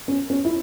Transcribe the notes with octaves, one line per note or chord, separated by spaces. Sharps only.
C#4
C#4
E4